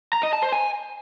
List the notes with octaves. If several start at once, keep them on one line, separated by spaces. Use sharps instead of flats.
A#5
D#5
A5
C5
G#5